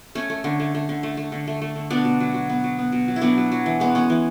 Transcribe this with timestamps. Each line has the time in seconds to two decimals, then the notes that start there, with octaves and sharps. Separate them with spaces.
0.15 A3 C#4
0.30 A3
0.44 D3
0.60 A3
0.74 A3
0.89 D3
1.03 A3
1.17 A3
1.32 D3
1.48 A3
1.62 A3
1.76 D3
1.90 B2 B3 D4
2.05 B2
2.20 F#3
2.34 F#3
2.49 B3
2.64 F#3
2.79 B3
2.92 B2
3.08 F#3
3.16 E4
3.21 F#3 B3 D4
3.37 F#3
3.52 F#3
3.66 E3
3.80 G#3 B3
3.95 B3 C#4
4.10 E3